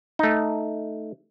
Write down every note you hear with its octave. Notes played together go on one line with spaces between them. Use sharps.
A3 D#4